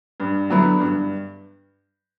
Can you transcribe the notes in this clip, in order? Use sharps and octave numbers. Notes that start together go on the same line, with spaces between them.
G2
D3 F#3 B3 E4
G2